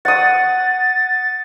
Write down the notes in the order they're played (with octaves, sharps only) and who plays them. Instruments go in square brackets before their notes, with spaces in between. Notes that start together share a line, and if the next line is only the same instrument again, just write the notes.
[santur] F#5 D#6 [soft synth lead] A6